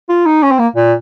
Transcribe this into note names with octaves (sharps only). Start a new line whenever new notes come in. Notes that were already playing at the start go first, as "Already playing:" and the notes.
F4
D#4
C#4
C4
A#3
A#2